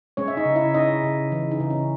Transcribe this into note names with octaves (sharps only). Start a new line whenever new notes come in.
G#3 C#4 C#5
E5
D#4 D#5
C#3
E4 E5
C#4 D#4 D#5
C#3
E3
D#4
C#3
C#4